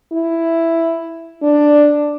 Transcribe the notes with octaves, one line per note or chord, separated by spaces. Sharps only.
E4
D4